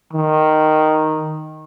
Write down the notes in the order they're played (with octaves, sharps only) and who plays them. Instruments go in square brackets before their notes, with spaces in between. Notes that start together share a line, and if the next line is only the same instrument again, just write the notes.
[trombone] D#3